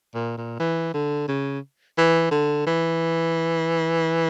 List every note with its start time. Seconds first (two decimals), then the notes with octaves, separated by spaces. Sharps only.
0.14 A#2
0.37 A#2
0.60 E3
0.94 D3
1.28 C#3
1.98 E3
2.31 D3
2.66 E3